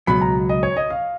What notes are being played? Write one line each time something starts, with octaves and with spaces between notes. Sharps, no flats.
C#2 B2 F#3 B5
A#5
D#5
C#5
D#5
F5